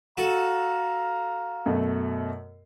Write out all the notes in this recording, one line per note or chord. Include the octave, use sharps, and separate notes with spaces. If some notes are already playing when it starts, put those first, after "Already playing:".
F#4 A4 F5 A#5
F#2 B2 A3